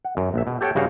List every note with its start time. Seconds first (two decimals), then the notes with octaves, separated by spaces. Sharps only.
0.05 F#5
0.17 F#2
0.34 A#1 E5
0.47 B2
0.61 G4 A4 C#5 F#5 G5
0.75 G2 C#3 F#4 G4 F5 F#5